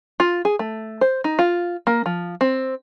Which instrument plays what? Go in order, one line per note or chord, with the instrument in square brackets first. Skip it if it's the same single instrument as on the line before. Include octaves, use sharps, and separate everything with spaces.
[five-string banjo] F4
G#4
A3
C5
D#4
F4
A#3
F3
C4